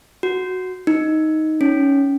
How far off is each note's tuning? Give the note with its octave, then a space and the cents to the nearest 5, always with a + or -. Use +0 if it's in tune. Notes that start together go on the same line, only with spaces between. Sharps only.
F#4 -5
D#4 +10
C#4 +10